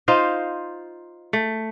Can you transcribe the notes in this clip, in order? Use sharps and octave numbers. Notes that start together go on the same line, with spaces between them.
D#4 F4 C5 D#5
A3